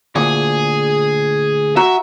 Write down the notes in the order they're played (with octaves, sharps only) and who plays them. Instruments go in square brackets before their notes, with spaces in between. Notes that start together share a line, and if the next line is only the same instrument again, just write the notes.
[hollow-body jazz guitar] D2 A#2 [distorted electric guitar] G#4
[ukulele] F#4 [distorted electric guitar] E5 [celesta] A#5